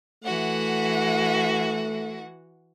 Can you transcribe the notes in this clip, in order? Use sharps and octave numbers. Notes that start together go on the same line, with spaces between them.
E3 A3 F#4 F#5